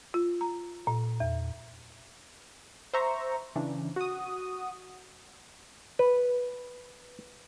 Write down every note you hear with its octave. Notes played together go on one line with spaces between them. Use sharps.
F4
A#5
A#2
E2
C5 E5 A#5 C#6
C#3 E3 D4
F#4 D#6
B4